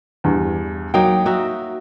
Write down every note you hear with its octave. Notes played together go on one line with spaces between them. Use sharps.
E2 G2
F#3 A#3 D#4 G5
D#4 F#4 E5